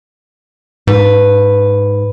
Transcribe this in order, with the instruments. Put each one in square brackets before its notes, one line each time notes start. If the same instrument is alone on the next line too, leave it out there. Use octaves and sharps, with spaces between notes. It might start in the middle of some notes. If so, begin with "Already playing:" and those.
[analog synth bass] G#2 [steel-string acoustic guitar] B4